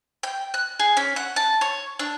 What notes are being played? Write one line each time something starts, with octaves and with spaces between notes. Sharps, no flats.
G5
F#6
G#4
C#4
F#5
A5
C#5
D4